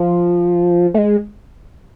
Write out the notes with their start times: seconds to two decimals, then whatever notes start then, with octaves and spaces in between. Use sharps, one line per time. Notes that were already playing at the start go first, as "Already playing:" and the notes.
Already playing: F3
0.94 A3
0.98 G#3